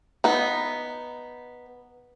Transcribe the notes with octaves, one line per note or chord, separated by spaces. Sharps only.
B3 D#4